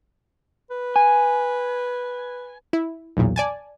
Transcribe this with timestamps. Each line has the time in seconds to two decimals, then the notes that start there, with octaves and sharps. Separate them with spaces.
0.71 B4
0.96 G#5
2.73 E4
3.17 B1 E2 A#2
3.36 D5 G#5 A5